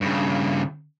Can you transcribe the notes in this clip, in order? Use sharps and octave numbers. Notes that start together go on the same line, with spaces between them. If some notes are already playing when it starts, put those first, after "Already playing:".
G2 C#3